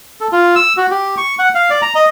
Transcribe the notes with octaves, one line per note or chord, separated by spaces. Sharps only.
A4
F4
E6
F#4
G4
C#6
F#5
F5
D5
A#5
D#5